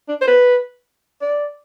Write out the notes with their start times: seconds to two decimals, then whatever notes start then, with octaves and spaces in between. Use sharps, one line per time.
0.09 D4
0.21 C5
0.27 B4
1.22 D5